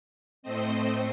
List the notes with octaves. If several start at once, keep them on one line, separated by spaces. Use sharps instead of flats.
A2 A3 C4 C5 D#5